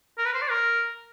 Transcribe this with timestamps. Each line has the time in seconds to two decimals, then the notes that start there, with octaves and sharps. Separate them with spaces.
0.18 A#4
0.25 B4
0.34 C5
0.42 D5
0.50 A#4